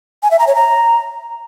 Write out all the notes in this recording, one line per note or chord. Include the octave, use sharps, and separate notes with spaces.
G#5
E5
A#5
C#5
A#5